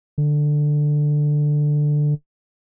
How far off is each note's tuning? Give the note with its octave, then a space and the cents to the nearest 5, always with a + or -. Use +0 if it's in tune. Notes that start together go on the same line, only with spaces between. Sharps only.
D3 +10